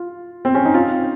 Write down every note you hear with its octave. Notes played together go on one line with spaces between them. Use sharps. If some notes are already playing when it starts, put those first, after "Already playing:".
Already playing: F4
C4
C#4
D#4
F4